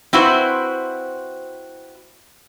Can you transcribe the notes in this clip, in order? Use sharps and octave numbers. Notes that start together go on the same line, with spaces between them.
C4 E4 F#4 B4 C5